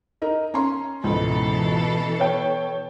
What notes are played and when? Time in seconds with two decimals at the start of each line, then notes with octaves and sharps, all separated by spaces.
0.22 D#4 A#4 D#5
0.54 C#4 A#5 C6
1.04 C#2 G#2 B2 E3 A4
2.20 B3 C#5 G5